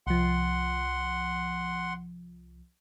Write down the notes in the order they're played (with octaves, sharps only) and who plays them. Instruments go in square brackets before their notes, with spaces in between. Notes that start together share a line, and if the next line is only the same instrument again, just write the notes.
[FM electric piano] C2 F3 [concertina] F#5 C6